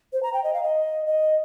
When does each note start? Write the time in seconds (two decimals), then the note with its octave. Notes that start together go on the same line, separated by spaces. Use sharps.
0.13 C5
0.23 A#5
0.33 G5
0.44 D#5
0.54 F5
0.63 D#5
1.06 D#5